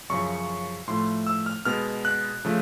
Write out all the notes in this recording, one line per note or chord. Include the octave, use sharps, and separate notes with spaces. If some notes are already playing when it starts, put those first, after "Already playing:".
F#2 C#3 F3 C#6
A2 F3 A3 C6
E6
F6
B2 G#3 B3 F6
F#6
C#3 F3 A3